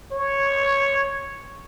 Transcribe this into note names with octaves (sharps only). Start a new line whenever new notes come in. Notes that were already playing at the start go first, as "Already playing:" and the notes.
C#5